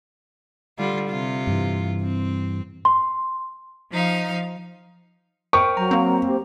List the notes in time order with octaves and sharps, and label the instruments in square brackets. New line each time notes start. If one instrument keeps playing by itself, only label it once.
[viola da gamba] D3 G3 F4
C3 F4
[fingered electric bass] G2 E3
[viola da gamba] C4
[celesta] C6
[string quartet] F3 D#4 F5
[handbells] A#4 C5 G5 [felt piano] C#6
[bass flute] F#3 [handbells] A#5
[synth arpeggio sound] A#3 C4
[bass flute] G4